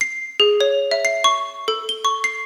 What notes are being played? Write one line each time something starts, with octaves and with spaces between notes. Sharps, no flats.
C7
G#4
C#5
E5
C7
C#6
A4
G7
C#6
C7